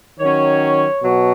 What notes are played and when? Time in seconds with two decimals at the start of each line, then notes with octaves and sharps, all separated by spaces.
0.19 D#3 F#3 C#4 C#5
1.02 B2 F#3